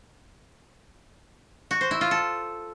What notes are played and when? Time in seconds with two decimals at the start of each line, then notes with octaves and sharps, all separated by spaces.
1.71 F#4
1.81 C5
1.91 E4
2.01 F4
2.11 A4